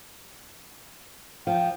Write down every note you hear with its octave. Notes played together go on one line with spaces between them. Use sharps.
F3 G5